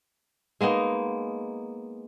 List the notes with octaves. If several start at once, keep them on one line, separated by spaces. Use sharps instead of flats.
G#3 A#3 B3 D#4